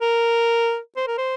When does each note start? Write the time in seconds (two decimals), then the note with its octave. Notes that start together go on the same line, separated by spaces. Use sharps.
0.02 A#4
0.97 C5
1.07 A#4
1.18 C5